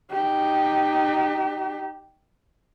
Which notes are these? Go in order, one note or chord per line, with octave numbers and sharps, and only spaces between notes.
D#4 G4